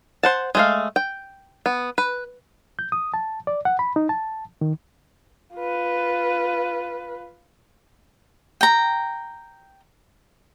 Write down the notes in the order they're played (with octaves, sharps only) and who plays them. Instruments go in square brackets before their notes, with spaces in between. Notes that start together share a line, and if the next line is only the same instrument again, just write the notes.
[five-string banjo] C5 F#5 A5
G#3 A3 F5
G5
B3
B4
[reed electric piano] G6
D#6
A5
D5
F#5
B5
D#4
A5
D#3
[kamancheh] F4 B4
[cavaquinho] G5 A#5